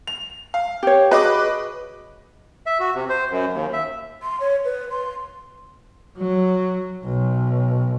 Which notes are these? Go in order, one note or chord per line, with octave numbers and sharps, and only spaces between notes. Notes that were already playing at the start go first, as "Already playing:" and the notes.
F7
F5
G4 C#5
F#4 G#4 B4 D#5 D6
E5
F#4
C3
C5
F#2
D#2
E5
C6
C#5
B4
C6
F#3
B1